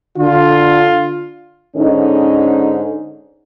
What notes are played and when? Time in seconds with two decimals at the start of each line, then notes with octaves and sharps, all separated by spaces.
0.17 D3 F4
1.76 G#2 D3 C#4 D#4